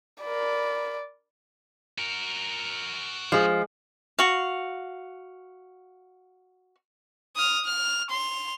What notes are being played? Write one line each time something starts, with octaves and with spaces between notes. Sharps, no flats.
A#4 D5 B5
F#4 A#4
F3 G#3 G#4
F#4 F5
D#6 F6
F6
C6 F7